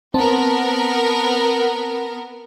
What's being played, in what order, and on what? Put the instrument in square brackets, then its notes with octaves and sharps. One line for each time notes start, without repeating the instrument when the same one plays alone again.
[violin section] B3 A#4 [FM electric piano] C4 A5